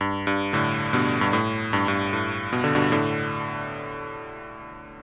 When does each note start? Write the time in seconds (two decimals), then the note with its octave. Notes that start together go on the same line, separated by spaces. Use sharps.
0.01 G2
0.27 G2
0.53 A2 D3
0.93 G2 B2
1.21 G2
1.33 A2
1.73 G2
1.88 G2
2.13 A2
2.53 B2
2.64 D3
2.75 G2 B2
2.92 A2 D3